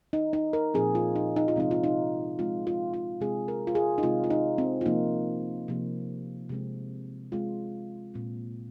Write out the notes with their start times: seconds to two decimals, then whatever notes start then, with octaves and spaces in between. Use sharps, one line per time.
0.13 D#4
0.33 D#4
0.53 A#4
0.74 A#2 F3 C4 G#4
0.95 F4
1.16 D#4
1.36 D#4
1.48 F4
1.56 C3 F3 G#3 C4 D#4
1.71 F4
1.84 D#4
2.39 C3 F3 G#3 C4 F4
2.67 F4
2.94 F4
3.21 C3 G#3 C4 G#4
3.48 A#4
3.67 F4
3.75 G#4
3.98 D#4
4.03 C3 G#3 C4 F4
4.24 F4
4.30 D#4
4.58 C4
4.81 F4
4.86 C3 F3 A#3 D#4
5.68 C3 F3 A#3
6.49 C3 G#3 C4
7.32 C3 G#3 C4 F4
8.14 A#2 G#3 C4